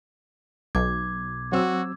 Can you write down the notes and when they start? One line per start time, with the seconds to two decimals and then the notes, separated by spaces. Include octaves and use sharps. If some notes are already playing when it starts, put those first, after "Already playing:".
0.75 B1 D6 G#6
1.52 F#3 C4 F#4 E6